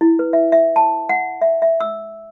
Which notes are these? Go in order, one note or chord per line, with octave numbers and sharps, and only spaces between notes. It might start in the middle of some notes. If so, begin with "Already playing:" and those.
E4
B4
E5
E5
A5
F#5
E5
E5
E6